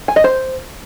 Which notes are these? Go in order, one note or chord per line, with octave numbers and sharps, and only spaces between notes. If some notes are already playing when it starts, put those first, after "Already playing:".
G#5
D#5
C5